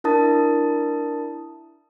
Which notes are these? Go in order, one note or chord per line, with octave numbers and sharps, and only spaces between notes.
D4 E4 A#4 A5 D#6 A6